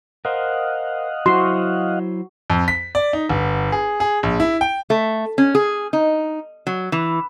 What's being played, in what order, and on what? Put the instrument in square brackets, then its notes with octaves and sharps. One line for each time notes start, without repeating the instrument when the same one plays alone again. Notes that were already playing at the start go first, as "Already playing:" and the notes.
[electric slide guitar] A#4 C5 [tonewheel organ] D#5 F5 F#5
[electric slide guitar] F#3 E4 C5 [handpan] F#4 [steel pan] C6
[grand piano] F2
B6
D5
D#4
G1
G#4
G#4
A#1
E4
G5
[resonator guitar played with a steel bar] A3
C#4
G#4
D#4
F#3
E3